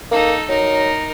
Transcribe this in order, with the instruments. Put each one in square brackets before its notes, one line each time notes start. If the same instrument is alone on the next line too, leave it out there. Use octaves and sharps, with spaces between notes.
[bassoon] A#3 [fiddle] D#4 A4
[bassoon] F#3 [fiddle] D#4 A#4